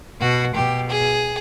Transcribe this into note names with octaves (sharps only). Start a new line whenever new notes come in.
B2 F#4
B2 G4
G#4